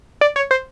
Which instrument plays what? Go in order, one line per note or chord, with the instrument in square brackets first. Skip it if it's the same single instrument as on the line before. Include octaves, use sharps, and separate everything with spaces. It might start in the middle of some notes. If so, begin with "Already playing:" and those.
[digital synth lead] D5
C#5
C5